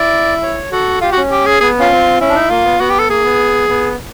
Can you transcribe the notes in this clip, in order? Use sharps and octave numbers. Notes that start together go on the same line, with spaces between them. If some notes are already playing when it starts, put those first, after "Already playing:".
Already playing: E4 D5
C#5
F#4 A4
F4 G4
F#4
C#4
G4
G#4
B3 G#4
C#4 F4
C4
C#4 E4
D4
D#4
A#3 F4
B3
B3 F#4
G4
A4
A#3 G#4
B3
B3